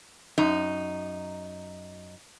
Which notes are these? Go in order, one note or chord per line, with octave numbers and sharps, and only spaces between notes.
F#2 D#4